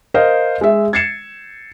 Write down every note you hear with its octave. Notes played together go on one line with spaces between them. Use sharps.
A#4 C5 D#5 F5
G#3 E5
G#6 A6 C7 C#7 E7